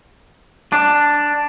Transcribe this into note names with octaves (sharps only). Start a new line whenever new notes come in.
D4